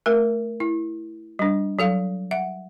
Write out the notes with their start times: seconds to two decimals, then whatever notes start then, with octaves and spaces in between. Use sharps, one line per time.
0.06 A3 A#4
0.60 E4
1.39 G3 D4
1.79 F#3 A4 F5
2.31 E5 F#5